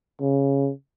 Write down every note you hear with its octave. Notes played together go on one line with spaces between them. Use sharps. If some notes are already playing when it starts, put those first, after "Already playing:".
C#3